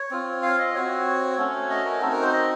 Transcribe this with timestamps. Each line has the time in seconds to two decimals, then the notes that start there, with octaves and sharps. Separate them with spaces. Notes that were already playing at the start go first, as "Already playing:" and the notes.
Already playing: C#5
0.11 C4 F4
0.43 F5
0.59 D#5
0.75 C4 F#4 C#5
1.38 A3 C#4 F#4
1.70 D#5
1.85 A#4
2.01 C4 D#4 F#4 A4
2.12 A#4
2.22 C5
2.33 D#5